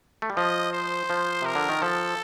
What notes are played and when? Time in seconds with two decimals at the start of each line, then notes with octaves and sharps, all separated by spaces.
0.22 A3
0.30 G3
0.37 F3 D#5
0.73 C5
1.10 F3
1.42 C3 A#4
1.55 D3
1.69 D#3
1.82 F3 A4